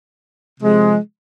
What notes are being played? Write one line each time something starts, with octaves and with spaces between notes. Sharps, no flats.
C3 F3 G#3